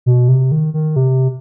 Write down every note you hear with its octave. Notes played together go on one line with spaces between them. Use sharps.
B2
C3
D#3
D#3
C3